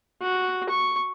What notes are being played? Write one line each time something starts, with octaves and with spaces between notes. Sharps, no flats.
F#4
C#6